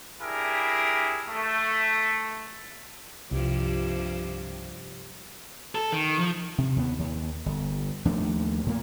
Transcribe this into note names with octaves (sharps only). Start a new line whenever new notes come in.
D4 E4 G4 G#4 A#4
A3
C2 G2 C3 F3
A4
D#3
F3
C3
D#2 B3
D#2
G1
D#2 F3 A3 D4
A2 A#3